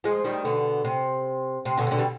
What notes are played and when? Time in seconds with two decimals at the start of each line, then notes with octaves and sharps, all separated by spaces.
0.04 F3 G#3
0.24 D#3 G3
0.45 B2 D3
0.85 C3
1.65 C3
1.78 B2 D3
1.87 C3
1.91 B2 D3
1.98 G3